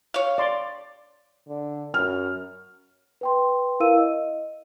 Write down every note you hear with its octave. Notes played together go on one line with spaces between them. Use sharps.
C#5 F5
D5 C6
D3
F#2 F6
B4 G5 C6
E4 A#4 F5 E6 D#7
D#5